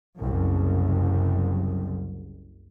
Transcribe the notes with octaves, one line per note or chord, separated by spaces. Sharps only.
F#1 C2 F#2